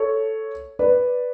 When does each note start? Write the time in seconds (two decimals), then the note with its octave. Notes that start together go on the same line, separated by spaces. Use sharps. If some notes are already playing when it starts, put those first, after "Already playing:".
Already playing: A4 C#5
0.79 B4 D5